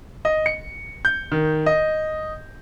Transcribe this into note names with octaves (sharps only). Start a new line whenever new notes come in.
D#5
C#7
G6
D#3
D#5